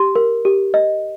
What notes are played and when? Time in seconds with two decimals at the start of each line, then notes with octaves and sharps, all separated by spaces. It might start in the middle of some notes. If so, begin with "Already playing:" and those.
Already playing: G4 C6
0.16 A#4
0.45 G4
0.74 D#5